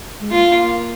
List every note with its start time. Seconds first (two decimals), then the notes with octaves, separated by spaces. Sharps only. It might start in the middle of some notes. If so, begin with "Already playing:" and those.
0.20 G#3
0.31 A#3 F4
0.50 A#3